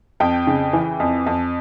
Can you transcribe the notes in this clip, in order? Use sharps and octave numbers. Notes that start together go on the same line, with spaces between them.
F2 G5
C#3
E3
F2
F2